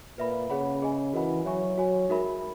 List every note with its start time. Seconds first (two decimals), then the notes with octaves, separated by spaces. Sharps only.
0.18 A#2 B4 E5 B5
0.50 C#3 G#4 C#5 F#5 B5
0.82 G#4 D#5 G#5
1.14 E3 F#4 A#4 D#5 F#5 B5
1.45 F#3 C#5 E5 G#5 C#6
1.78 F#4 C#5 G#5
2.09 G#3 D#4 F#4 A#4 E5 B5